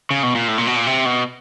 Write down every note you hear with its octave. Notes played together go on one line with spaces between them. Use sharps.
C#3
B2
A#2
A2
A#2
B2
A#2
C3
B2